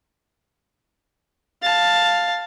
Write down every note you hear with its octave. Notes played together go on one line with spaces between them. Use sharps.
F5 A5